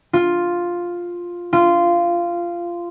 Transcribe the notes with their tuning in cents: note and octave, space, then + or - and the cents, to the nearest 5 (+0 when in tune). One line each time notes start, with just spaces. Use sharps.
F4 +5
F4 -15